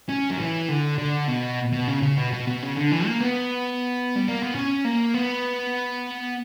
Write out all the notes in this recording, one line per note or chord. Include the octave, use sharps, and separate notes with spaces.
C#4
F#3
E3
D3
D3
B2
B2
C#3
C#3
B2
B2
B2
C#3
D3
E3
A#3
B3
G3
A#3
B3
C#4
A#3
B3